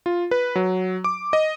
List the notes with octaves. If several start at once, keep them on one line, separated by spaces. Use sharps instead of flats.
F4
B4
F#3
D6
D#5